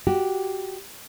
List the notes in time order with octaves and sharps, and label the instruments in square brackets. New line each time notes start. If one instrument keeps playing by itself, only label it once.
[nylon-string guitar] F#4 G4